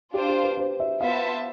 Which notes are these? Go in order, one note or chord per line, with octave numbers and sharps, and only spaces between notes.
D4 F4 G4 C5
G4
B4
C5
E5
B3 F4 C5 E5 F5 A5